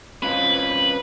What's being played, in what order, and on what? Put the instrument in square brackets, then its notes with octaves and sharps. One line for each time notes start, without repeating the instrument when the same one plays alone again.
[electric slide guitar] C4 C#4 F4 [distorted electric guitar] B4